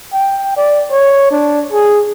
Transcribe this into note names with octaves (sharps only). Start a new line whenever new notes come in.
G5
D5
C#5
D4
G#4